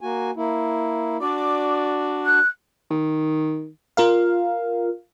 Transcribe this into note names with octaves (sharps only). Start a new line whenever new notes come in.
A#3 F#4 G#5
A#3 E4
D4 F#4 D5 D6
F#6
D#3
F4 A#4 F5